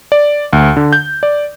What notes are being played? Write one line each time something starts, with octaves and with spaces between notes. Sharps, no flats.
D5
D2
D3
G6
D5